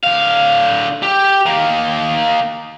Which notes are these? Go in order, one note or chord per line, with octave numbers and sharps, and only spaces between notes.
D3 F5
G4
D#3 A#3